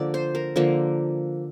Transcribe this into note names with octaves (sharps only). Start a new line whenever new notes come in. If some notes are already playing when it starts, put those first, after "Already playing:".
Already playing: D3 F3 A#3 D5
C5
A#4
D3 F3 A#3